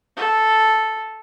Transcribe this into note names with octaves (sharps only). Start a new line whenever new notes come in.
A4